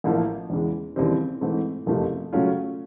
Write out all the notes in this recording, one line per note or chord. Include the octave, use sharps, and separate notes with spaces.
A1 A2 F3 A#3
E2 C#3 E3 G#3
D#2 C#3 E3 G3 C4
G#2 E3 A3 C4
F#1 F2 C3 F3 A3
C#3 F#3 A3 C#4 F4